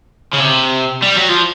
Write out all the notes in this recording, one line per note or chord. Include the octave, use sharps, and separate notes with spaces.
C#3
C3
G3
F#3
F3